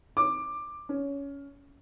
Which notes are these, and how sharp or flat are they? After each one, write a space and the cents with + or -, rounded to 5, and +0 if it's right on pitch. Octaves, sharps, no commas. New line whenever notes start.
D6 +10
C#4 +15